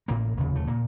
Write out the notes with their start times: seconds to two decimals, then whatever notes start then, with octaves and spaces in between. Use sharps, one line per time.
0.08 A1 A2 A#3
0.37 F1 D#2 C#3
0.56 A3
0.67 A#2 A#3